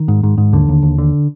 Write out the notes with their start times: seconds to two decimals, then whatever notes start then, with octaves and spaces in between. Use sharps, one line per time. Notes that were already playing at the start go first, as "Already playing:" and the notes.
Already playing: D#3
0.08 G#2
0.23 G#2
0.38 G#2
0.53 D#2 D3
0.69 D#2
0.83 D#2
0.98 D3